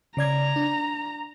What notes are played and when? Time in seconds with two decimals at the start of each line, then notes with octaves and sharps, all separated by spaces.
0.17 C#3 D5 A#5 G#6
0.56 D4